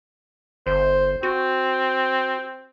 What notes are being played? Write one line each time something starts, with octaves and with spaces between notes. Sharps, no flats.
G1 C5
C4 F#4